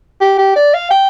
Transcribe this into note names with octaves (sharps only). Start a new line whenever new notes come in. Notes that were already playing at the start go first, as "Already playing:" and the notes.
G4
G4
D5
F5
G5